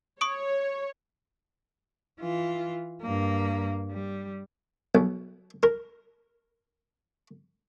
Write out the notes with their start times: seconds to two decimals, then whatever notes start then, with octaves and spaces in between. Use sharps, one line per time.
0.21 C#5 C#6 D#6 D7
2.20 E3 F4
3.02 G2 A#3
3.91 G3
4.95 B1
5.63 A#4